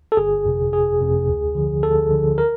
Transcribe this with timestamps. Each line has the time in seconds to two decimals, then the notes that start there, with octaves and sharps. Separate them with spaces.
0.12 A4
0.17 G1 G#4
0.45 F2 C3
0.72 G1 G#4
1.00 F2 C3
1.28 D2
1.55 D3 F3
1.83 D2 A4
2.11 D3 F3
2.38 A#4